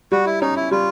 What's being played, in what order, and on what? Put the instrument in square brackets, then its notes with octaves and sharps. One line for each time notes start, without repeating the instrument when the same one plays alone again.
[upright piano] G3 [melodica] F#4
[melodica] E4
[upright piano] C#4 [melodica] D#4
[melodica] E4
[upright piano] G3 [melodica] F4